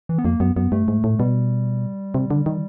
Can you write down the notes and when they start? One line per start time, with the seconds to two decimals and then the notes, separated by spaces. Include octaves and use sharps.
0.09 E3
0.18 B3
0.25 F2 A#3
0.40 F#2 B3
0.56 F#2 B3
0.72 G2 A3
0.88 G#2
1.04 A2
1.19 B2 G3
2.14 C3
2.30 D3
2.46 D#3